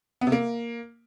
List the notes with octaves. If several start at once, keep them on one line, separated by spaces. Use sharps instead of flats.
B3
C3
A#3